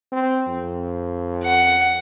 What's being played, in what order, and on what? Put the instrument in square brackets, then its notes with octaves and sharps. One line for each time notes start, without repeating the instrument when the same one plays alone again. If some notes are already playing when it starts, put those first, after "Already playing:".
[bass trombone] C4
F2
[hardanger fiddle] F#5